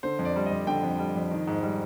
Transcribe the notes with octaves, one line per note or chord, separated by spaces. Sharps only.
D3 C5
F2
D5
G3
D#5
F2
D3 G5
F2
G3
F2
D#3
G#2
G3